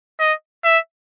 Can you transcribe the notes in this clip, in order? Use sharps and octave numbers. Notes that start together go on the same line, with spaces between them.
D#5
E5